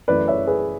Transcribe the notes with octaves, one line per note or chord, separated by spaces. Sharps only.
F#2 E3 A3 B4 D5
C#5 E5
G#4 B4